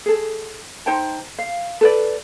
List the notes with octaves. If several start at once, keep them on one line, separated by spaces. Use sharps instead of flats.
G#4 A4
D#4 C5 G5 A5
F5
A4 B4 D5